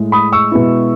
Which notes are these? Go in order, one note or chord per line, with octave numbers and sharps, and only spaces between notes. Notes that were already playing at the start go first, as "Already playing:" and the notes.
Already playing: A2 G#3 E4
B5 D#6
C#6 E6
B2 G#3 B3 E4